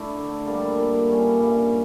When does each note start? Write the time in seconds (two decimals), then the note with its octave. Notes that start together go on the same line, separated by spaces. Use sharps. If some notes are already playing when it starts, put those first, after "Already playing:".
Already playing: A3 D4 E4
0.15 D3
0.46 G3 A#3 D4
0.77 A#2
1.08 G3 C#4
1.39 G2